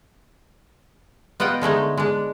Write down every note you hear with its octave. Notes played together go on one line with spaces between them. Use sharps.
B3 F4 D#5 F#5 G5
D3 G#3 A3 D#4
G#3 D4